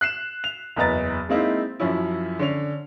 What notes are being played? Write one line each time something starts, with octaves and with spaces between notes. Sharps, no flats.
F#6 C7 E7
F7
F#1 E2 B4 D#5 A#5 A6
G#3 A#3 C4 D#4 E4
F#2 F3 C#4 E4
D3 C#4 F7